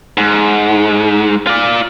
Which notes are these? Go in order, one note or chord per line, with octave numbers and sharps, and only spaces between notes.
G#2
F4 D5